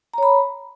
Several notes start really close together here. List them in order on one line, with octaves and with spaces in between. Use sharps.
A#5 C#5 B5